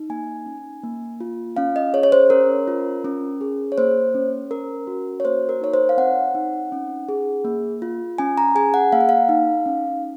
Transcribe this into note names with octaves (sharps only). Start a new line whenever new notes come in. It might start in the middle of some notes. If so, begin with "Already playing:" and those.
Already playing: D#4
A#3 G#5
C#4
A#3
F4
C#4 F5
D#5
G#4 C#5
C#5
C5
C#4 A#4
F4
C#4
G#4
C#5
A#3 C5
C#4
C#4 A#4
F#4
C#5
A#3 C5
A#4
D#4 C#5
C5
F5
C4 F#5
D#4
C#4
G#4
A#3
F4
C#4 G#5
A#5
G#4 G#5
F#5
A#3 F5
F#5
F5
D#4
C#4